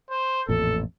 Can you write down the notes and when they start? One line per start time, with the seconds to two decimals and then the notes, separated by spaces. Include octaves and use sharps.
0.11 C5
0.49 A1 F2 A#2 A4